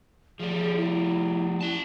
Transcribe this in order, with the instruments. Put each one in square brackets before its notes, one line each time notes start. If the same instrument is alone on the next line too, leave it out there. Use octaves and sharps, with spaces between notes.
[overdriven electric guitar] F3 G3 [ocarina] G#4
[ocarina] E4
[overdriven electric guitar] C#4 A5 [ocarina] E4